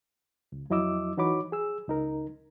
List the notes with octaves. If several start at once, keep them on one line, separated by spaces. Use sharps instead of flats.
C#2
F2 F#3 E4 D#5 D6 E6
E3 D#4 F#4 C#5 B5 D6
G#4 E6
C#2 D#4 A#4